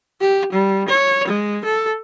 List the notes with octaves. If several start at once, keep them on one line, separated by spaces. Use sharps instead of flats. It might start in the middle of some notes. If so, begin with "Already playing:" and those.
G4
G3
C#5
G#3
A4